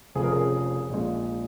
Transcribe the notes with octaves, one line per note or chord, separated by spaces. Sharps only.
F1 F2 C#3 F3 G#4
A#4
G#4
A#1 A#2 G#3